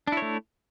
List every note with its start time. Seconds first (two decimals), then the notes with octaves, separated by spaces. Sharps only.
0.07 D4
0.12 E4
0.17 C#5
0.22 A3